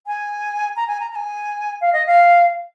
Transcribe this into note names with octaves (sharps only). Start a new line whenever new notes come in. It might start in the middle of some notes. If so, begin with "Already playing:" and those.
G#5
A#5
G#5
A#5
A#5
G#5
F5
D#5
F5